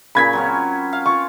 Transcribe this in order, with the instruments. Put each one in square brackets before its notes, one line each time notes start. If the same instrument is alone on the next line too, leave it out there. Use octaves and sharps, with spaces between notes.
[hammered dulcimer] A#2 C#3 [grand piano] B5 G#6 B6
[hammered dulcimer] F#3 C4 C#4
F5
[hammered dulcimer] F4 [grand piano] C#6